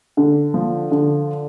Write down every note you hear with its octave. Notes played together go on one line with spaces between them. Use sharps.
D3
F3
D3